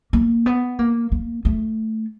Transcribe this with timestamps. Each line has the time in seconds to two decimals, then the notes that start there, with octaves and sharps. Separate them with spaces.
0.13 A#3
0.46 B3
0.79 A#3
1.12 A#3
1.45 A3